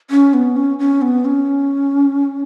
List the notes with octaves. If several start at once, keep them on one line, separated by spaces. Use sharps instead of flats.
C#4
B3
C#4
C#4
B3
C#4